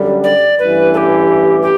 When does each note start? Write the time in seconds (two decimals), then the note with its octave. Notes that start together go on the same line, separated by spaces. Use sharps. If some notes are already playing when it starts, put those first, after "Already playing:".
Already playing: F#2 D3 G3
0.24 D5
0.59 A1 G2 E3 B4
0.94 A4
0.97 G4
1.62 G4